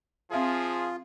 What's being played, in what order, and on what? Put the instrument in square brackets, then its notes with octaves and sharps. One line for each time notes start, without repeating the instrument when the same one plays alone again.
[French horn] F3 [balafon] C4 E5 F5 [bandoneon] F4 [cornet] G#4